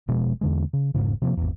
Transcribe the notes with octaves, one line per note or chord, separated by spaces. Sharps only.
E1 B2 F3 G#3
E2 D3 G#3
C#3
E1 B1 G#2 C#3
C3 F3 F#3 A#3
G#1 E2